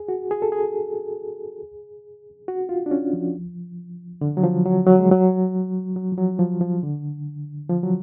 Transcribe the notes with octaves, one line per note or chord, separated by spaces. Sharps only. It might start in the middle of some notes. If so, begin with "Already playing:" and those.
Already playing: G#4
F#4
G#4
A4
G#4
F#4
F4
D4
C#4
F3
D3
F#3
F3
F#3
F#3
G#3
F#3
F#3
F3
F#3
F3
F3
D3
F3
F#3